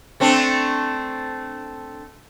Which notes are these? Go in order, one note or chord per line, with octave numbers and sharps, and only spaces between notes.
A3 C4 D4